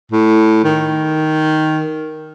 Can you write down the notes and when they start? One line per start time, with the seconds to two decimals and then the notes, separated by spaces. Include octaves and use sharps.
0.12 A2
0.64 D#3